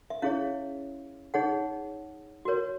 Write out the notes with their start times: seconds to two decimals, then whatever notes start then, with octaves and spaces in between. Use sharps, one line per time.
0.10 E5
0.22 C#4 E4 G#4 C#5 F5
1.34 D#4 G#4 C#5 F#5
2.45 F#4 A#4 C#5